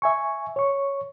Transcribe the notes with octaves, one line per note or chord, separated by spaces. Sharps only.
E5 G#5 C#6
C#5 C#6